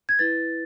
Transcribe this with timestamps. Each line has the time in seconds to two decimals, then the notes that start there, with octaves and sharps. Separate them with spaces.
0.09 G#6
0.19 E4 B4 A6